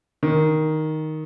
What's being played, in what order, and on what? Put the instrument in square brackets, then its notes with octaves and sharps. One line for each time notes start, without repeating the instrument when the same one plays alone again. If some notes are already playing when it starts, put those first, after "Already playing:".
[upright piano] D#3